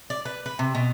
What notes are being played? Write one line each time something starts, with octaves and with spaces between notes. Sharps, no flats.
D5
B4
B4
C3
B2